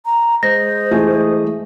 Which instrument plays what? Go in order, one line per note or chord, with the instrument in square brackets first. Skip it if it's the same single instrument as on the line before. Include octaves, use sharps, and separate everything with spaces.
[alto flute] A#5
[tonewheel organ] G#3 D#5 [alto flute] C5 [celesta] A#6
[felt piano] E3 A3 G#4